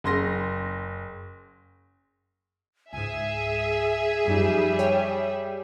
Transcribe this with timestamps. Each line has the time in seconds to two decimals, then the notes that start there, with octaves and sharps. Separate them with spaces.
0.04 F#1 C6 A#6
2.93 C#2 G#2 G#4 E5 G#5
4.27 F#2 F3 G3 D#4
4.79 C#5 G5